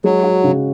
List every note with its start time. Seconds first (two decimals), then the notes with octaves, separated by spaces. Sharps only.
0.04 F#3 G#3
0.23 F#4
0.44 C#3